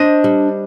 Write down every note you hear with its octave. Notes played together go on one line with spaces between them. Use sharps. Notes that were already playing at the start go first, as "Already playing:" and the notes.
Already playing: D4 C5 D#5
G3